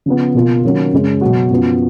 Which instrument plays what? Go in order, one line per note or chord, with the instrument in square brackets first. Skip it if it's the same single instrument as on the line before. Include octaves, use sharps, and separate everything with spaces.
[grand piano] C#3 F3 B3
B2 A#3 F4
D#3 F#3 A#3 C#4 F#4
F#2 C#3 G#3 C#4
B2 F#3 B3 F#4
F#2 F3 B3 F#4